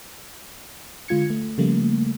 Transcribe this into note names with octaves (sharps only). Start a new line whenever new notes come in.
D3 G#3 F4 G#6 C#7
A3
C#3 F3 G3 A3 A#3